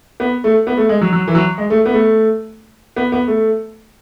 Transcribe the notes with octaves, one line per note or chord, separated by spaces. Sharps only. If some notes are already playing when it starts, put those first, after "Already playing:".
B3
A3
B3
A3
G#3
F#3
F#3
E3
F#3
G#3
A3
B3
A3
B3
B3
A3